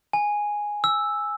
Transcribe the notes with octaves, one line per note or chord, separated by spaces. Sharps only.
G#5
E6